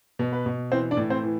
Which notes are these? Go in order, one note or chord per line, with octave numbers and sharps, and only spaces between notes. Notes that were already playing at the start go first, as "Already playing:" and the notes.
B2
B4
B2
E3 C4 C5
D4 D5
A2
C4 C5
E3